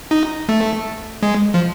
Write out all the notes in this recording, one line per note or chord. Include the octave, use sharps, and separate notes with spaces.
D#4
A3
G#3
F3